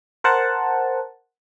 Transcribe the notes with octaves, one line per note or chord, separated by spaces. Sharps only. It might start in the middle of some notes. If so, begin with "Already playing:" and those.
A#4 C5 F#5 A5